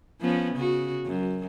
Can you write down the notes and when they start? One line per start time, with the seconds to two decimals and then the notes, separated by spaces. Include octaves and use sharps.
0.21 F3 B3 C#4
0.55 C#3 F#4
1.06 F#2